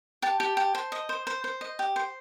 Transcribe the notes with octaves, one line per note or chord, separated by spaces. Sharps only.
G4 A5
G4
G4
C5
D#5
C5
C5
C5
D#5
G4
C5